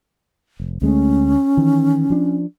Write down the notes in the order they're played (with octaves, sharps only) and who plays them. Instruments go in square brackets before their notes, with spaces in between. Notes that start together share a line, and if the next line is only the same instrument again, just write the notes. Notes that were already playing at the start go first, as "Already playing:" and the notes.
[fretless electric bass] F1
[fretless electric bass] D2 G#3 A3 [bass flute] C#4
[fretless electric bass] D#3 E3
F3 D4